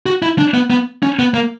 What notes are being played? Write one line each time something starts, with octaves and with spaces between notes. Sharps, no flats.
F#4
E4
D4
B3
B3
C#4
B3
A#3